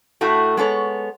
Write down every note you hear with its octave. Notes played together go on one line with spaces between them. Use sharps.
A2 A3 E4 F#4
G#3 B3 A4 C#5